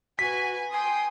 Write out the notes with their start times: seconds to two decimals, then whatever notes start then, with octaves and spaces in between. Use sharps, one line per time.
0.19 F#4 B4 G#5 B6
0.73 G5 G#5 C6 D#6